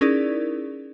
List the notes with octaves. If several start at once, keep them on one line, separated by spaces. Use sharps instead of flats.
C#4 D#4 E4 G#4 A#4 D5